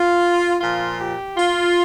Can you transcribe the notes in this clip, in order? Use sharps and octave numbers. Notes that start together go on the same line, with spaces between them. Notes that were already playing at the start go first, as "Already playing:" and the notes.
Already playing: F4
A#2 F3 F4
G4
F4